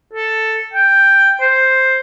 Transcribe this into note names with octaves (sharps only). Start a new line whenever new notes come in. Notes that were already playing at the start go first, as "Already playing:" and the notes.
A4
G5
C5